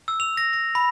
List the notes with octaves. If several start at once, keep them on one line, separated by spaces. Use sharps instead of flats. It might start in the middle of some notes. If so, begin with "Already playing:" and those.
E6
F7
A#6
A#6
B5